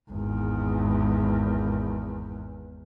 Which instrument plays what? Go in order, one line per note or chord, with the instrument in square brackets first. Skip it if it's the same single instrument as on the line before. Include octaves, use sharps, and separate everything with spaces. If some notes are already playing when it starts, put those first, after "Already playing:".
[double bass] G#1 E2